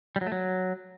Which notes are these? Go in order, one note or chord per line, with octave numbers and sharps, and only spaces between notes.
G3
F#3
A3
F#3